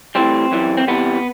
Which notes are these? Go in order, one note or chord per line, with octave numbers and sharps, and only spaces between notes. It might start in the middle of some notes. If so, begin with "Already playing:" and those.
A2 E3 G3 C4
F#2 E3 G3
C4
E2 C3 E3 G3 B3